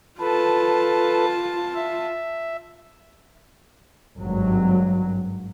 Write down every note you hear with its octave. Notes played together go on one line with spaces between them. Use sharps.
F4 A4 B4 A5
E5
G#1 G2 F#3